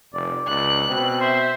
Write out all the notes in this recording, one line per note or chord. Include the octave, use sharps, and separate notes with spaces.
F1 D5
C#2 F#6
B2 C4
C5 E5